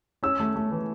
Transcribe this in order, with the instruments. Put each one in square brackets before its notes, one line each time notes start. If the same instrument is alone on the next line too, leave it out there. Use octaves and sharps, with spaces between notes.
[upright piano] C#4 E6
A3
A3
E3